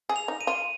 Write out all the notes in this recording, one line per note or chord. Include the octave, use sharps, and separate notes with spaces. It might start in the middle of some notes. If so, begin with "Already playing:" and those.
G#4
F7
D#4
D#7
F4